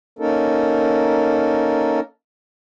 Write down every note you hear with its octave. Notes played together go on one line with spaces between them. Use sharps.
A#3 C#4 D#4 A4 A#4